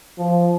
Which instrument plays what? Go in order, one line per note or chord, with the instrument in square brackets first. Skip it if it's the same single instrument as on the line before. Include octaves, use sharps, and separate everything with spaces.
[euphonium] F3